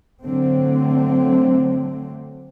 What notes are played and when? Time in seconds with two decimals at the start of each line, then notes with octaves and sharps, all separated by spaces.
0.24 D3 F#3 A3 C4